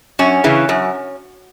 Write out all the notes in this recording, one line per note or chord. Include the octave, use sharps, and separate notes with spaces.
F#2 C#4
C#3 E3
F#2